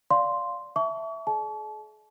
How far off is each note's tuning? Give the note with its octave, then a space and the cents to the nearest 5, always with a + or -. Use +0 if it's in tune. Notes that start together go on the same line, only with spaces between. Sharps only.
D5 -10 F5 +10 C6 +0
E5 +0 A5 +0 C#6 +40
G#4 +40 D5 +5 A5 -35